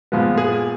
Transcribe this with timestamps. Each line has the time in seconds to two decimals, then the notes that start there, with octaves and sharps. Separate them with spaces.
0.12 A#2 F3 G#3 B3
0.38 G#4